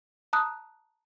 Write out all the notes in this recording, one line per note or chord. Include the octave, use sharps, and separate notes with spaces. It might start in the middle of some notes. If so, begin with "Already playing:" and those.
A5 A#5 D#6 F#6